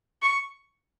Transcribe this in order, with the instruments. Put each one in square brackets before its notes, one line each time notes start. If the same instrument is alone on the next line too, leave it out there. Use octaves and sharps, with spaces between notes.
[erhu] C#6